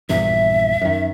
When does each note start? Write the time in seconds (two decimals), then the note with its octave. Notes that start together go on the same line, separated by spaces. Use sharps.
0.09 A#1 E2 G2 E5
0.81 F#2 D#3